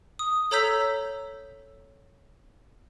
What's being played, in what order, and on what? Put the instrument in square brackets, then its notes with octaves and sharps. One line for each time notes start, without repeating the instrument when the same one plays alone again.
[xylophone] D#6
A4 C#5 A#5 E6 G6 B6